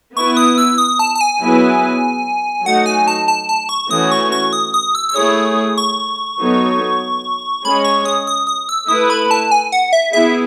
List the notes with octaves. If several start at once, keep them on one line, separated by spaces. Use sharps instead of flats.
B3 E4 B4 C#6
D#6
E6
D#6
A5
A5
G#5
F#3 B3 E4 G#4 B4
F#3 A3 D#4 F#4 F#5
G#5
A5
A5
A5
C#6
E3 A3 C#4 F#4 C#5 D#6
C#6
C#6
D#6
D#6
E6
E6
A3 E4 G#4 C#5 D#6
C#6
F#3 B3 D#4 A4 C#5
G#3 C#4 G#4 C#5 B5
C#6
D#6
D#6
D#6
E6
A3 E4 B4 D#6
B5
A5
G#5
F#5
E5
B3 E4 G#4 E5